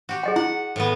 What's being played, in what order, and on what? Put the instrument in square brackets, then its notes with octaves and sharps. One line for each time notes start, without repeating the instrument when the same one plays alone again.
[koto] F#4 G4
[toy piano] G#4 D#5 F#5
[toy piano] E4 [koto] F#5
[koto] A2 E3 B3